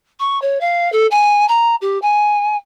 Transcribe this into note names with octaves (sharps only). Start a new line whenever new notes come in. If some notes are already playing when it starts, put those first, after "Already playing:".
C#6
C#5
F5
A4
G#5
A#5
G4
G#5